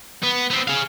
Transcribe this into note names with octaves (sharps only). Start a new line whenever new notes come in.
B3
B3 C4
G#4 F5